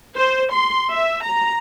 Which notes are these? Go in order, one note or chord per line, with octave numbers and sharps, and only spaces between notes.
C5
C6
E5
A#5